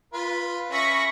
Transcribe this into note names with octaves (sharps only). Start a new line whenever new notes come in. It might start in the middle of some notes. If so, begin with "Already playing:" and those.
F4 B4
C#4 C#5 E5 B5 C#6 A#6